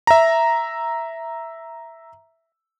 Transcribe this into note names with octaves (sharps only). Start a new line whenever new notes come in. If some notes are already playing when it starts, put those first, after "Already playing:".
E5 A#5